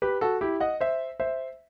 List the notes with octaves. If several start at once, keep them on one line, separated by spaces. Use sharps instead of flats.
G4 B4
F#4 A4
E4 G4
D#5 F#5
C5 E5
C5 E5